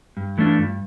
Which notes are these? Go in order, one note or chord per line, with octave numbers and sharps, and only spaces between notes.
G2
E3 A3 D4 F4
G2